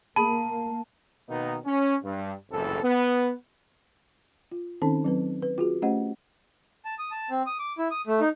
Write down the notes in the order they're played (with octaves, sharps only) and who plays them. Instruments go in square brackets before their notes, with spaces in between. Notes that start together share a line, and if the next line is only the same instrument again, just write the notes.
[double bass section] A#3 [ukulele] G#4 B5 [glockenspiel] A5
[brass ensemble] B2 D#3 A#3 B3 D#4
C#4
G2
F#1 C2 F2 A2 E3 A4
B3
[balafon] F4
D#3 C4 C#4 D#4 A4 A5
F#3 C4 B4
B4
F4 F#4 G#4
A3 C#4 G4 C5 D#5 F#5
[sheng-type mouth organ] A5
D#6
A5
C4
D#6
D6
E4
D#6
A3
D#4